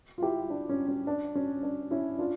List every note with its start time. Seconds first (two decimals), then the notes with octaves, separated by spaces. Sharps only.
0.18 F4
0.22 E4 G4
0.50 D4
0.69 C#4
0.88 C#4
1.07 D4
1.35 C#4
1.63 D4
1.91 C#4 E4
2.19 D4 F4